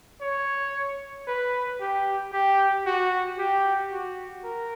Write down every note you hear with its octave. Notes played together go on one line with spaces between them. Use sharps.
C#5
B4
G4
G4
F#4
G4
F#4
A#4